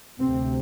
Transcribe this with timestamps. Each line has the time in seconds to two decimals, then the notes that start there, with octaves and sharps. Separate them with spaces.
0.20 D2 C3 C4